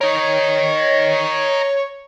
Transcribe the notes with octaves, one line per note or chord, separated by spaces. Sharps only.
A#4 C#5 D#5